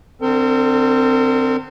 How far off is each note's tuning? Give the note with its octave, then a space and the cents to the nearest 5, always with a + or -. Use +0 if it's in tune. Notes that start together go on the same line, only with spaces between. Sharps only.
D3 +0 C4 -5 A#4 -45